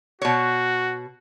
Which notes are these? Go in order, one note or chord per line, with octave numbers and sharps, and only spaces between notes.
B2 F#4 C#5